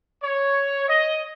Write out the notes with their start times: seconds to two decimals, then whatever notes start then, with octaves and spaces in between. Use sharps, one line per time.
0.22 C#5
0.87 D#5